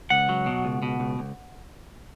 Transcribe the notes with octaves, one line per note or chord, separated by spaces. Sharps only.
C#2 F#5
F#3
B2
C#2
B2
C#2
C#2